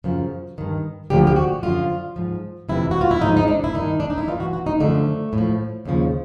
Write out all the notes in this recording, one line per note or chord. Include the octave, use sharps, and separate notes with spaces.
F#2 C#3 F3
G2 D#3
D2 D3 F3 G4
G4
F#4
F#2 D3 F3 F4
G#2 F3
F2 C3 E3 E4
F#4
F4
E4
G#2 F3 D#4
D#4
D4
E4
G2 D#3 D#4
D4
D#4
E4
G2 E3 F4
F#4
F#4
D#4
F#2 D3 F3 A3
A2 F3
D#2 C#3 F3